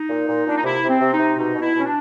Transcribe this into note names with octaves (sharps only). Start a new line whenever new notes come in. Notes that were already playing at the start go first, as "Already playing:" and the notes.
Already playing: D#4
A#2
A#2
A#2 D4
D#4
C3 E4
C3 C4
C3
D#4
C3
B2 D#4
B2
E4
B2
C#4
D4